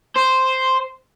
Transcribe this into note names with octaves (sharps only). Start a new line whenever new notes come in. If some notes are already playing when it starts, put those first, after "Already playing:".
C5